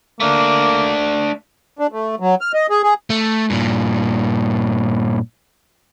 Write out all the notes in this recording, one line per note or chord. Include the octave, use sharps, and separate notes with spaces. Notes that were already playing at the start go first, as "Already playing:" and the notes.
A3 A#3 D4
D4
A3
F#3
F6
D#5
G#4
G#4
A3
G2 A#2